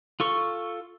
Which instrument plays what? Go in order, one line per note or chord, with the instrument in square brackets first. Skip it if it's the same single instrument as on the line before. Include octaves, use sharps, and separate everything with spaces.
[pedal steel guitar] F4 A4 C#6